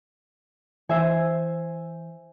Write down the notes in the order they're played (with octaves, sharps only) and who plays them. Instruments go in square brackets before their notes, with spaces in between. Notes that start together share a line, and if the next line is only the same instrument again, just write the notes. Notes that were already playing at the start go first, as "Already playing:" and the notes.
[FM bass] E3 [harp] C5 E5 G#5